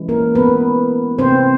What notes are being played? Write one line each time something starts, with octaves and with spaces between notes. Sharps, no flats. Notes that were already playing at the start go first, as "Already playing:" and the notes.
Already playing: E3 G#3 C#4 E4
A#3 A#4
B3 B4
C4 C5